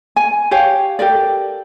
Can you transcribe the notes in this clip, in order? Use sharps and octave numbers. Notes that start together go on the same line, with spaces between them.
G#5
G4 C#5 F5
G4 A4 A#4 D5